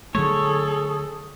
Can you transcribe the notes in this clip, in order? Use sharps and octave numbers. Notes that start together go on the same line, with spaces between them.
D3 F#3 A3 G#4 A4 C#5